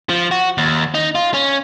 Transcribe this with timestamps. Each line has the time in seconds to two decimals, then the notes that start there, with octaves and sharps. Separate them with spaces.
0.09 F3
0.31 F#4
0.58 D#2
0.94 D#4
1.15 F4
1.34 C#4